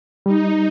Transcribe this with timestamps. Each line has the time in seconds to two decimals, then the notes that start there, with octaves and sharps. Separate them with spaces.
0.26 G3 D#4